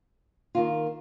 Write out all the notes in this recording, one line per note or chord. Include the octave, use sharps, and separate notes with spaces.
D#3 A#3 F4